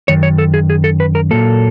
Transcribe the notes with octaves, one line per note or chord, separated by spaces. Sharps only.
F#2 D#3 C#5
C#5
A4
G#4
G#4
A4
B4
A#4
A#2 F#3 A#3 A4